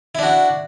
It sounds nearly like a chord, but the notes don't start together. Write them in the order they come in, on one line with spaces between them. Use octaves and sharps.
E4 D4 F#4